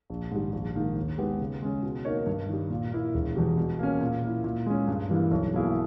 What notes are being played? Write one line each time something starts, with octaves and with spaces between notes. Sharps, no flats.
A#1
G#2 D#3 G3
A#1
G#2 D#3 A#3
D#2
D#3 G#3 B3 G4
C#3
G#3 C#4
B2
A#3 D#4 A#4 C#5
G2
D#3 G3
A#2
A#3 E4
E1
E2 B2 G3
B2
A#3 C#4
A#2
A#3 E4
A#2
G#3 C#4
G2
E3 G3 A#3 E4
B1
B2 A#3 E4 G#4